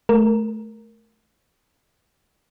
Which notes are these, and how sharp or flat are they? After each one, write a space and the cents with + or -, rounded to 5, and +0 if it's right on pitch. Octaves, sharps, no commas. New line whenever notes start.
A3 -20 A#4 +0